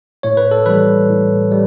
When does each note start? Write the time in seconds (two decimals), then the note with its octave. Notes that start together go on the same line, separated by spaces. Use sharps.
0.23 A2 C#5
0.37 B4
0.51 A4
0.66 E3 G3 B4
1.09 A2
1.52 G3